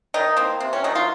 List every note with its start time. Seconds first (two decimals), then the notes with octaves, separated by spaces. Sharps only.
0.14 D#3 D#4
0.37 A#3 C4
0.60 C3 C4
0.73 C#4
0.84 D#3 F#3 D#4
0.95 F4